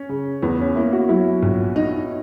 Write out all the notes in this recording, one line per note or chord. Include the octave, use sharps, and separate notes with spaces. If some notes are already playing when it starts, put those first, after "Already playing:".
Already playing: C#4
C#3
E2 B3
C#4
A#3 E4
F#4
F#3 E4
A#1
D#4